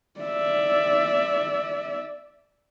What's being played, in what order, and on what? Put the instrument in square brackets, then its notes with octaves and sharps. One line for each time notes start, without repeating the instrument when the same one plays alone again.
[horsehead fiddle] D5 E5